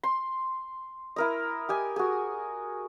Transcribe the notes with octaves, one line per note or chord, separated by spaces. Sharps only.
C6
E4 A#4 D#5
G4 D#5 G#5
F#4 G#4